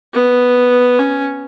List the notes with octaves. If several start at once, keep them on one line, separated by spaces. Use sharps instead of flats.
B3
C#4